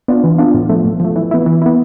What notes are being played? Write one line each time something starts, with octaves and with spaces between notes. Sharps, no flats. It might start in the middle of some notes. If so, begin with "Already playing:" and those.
B3 D4 F4
E3
B3 D4 F4
A2
F3 A3
A2
F3 A3
E3
B3 E4
E3
B3 E4